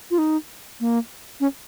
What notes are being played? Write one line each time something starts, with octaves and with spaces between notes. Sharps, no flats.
F4
D#4
A#3
C#4